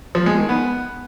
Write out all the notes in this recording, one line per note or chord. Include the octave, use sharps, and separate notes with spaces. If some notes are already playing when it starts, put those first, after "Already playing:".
F3
G#3
D#3
B3